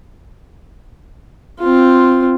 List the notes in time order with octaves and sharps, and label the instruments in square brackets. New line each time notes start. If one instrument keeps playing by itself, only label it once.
[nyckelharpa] C4 F4